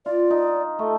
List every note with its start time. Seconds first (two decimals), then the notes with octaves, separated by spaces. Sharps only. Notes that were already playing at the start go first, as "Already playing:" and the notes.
0.06 F4 D5
0.30 D#4
0.79 A3 A4